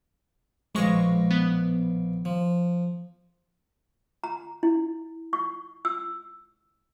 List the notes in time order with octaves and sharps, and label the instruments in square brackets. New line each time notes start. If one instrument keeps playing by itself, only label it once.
[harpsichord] A#1 B2 F5 [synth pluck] G#3 C#6 A#6
[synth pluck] B3
[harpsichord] F3
[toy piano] A#5
E4
C#6
E6